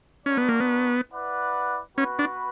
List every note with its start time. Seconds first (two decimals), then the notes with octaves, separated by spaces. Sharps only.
0.26 C#4 D4 F#4 A#4 D5
0.37 B3
0.49 A#3
0.60 B3
1.12 E4 B4 D5 F#5
1.97 B3 C#4 F#4 B4
2.19 D4